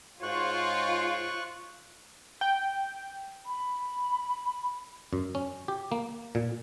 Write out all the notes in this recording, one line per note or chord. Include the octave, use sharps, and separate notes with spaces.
G#2 F4 F#4 C5 C#5 C#6 F#6
G5
B5
F#2
C#4
G4
A#3
A#2